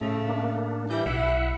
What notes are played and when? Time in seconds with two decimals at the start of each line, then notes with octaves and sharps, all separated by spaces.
0.01 A2 C#3 A3
0.27 A#3 D4
0.90 E3 G3 E4 G6
1.06 B1 E4 E5 F#5